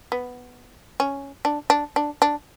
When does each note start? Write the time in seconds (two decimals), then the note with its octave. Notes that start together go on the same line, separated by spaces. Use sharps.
0.12 B3
1.00 C#4
1.45 D4
1.70 D4
1.96 D4
2.22 D4